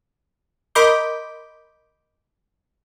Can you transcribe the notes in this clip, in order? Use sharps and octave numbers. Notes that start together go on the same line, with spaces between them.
A#4 D#5 B5 C6 D6 G6